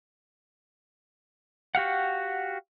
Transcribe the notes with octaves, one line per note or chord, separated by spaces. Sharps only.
F#4 G4 F5 F#5